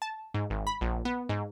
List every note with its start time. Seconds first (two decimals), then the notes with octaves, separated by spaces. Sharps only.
0.02 A5
0.34 G#2
0.50 G#1
0.67 B5
0.81 A#1
1.05 B3
1.29 G#2